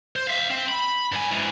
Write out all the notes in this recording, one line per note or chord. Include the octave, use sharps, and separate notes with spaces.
C5
E5 F5
C4
B5
G2 G#5
G#2 E3